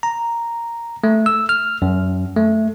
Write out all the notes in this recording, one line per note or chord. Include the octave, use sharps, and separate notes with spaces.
A#5
A3
E6
F6
F#2
A3